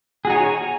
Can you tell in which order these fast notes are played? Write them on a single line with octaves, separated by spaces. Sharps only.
G#4 F#4 D#4 G#5 C#5